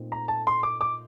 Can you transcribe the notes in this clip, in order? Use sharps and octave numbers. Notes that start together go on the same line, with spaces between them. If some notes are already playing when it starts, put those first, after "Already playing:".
Already playing: A#2 A3 C4 D#4
A#5
A5
C6
D6
D6